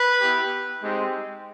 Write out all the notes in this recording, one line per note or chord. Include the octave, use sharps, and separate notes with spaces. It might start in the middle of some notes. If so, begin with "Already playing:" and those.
Already playing: B4
B3 E4 G4
G#3 C4 D#4 G4